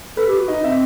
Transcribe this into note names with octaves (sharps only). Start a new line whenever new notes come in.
A4 B4
G4
F#4
D#4 D#5
C4 E5